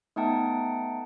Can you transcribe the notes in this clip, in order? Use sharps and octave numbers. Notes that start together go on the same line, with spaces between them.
A3 B3 D#4 F#5 G5 A5